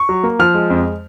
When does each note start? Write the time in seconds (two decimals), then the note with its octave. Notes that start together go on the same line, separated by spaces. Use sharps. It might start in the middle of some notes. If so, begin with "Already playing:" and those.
Already playing: C#6
0.09 F#3
0.24 A#3
0.39 F3 F6
0.54 G#3
0.70 F2